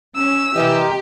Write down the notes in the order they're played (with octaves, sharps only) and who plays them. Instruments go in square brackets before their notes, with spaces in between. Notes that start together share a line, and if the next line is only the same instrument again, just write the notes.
[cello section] C#4 [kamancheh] E6
[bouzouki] C3 A#4 D#5 [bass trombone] E3 [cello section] G4